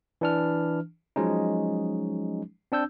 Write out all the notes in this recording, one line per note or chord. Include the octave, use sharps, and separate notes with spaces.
E3 D4 F6
F3 F#3 G#3 C#4 D#4
C4 D4 E6 G6